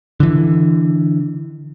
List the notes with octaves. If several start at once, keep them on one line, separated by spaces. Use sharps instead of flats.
D3 E3